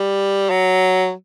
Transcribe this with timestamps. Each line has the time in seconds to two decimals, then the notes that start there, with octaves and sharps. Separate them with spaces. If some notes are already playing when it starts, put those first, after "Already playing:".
Already playing: G3
0.50 F#3